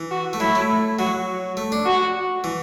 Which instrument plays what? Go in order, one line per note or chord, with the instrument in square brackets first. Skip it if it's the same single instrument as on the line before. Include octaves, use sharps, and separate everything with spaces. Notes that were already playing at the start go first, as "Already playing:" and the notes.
Already playing: [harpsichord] E3
[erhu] F#4
[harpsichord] A3
[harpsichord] F#3 [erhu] E4
[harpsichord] A3
[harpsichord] F#3 [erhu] F#4
[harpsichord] A3
D4
[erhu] F#4
[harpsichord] E3